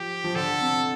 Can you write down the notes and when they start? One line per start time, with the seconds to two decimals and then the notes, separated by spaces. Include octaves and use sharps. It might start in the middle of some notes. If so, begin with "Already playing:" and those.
Already playing: F3 G4
0.24 F3
0.35 D3 A4
0.60 C3